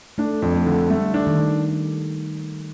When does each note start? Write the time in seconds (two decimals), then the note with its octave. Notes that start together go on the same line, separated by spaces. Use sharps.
0.18 A3 D4
0.42 F2
0.55 A3
0.66 D3
0.90 G3 A3
1.14 D4
1.27 D#3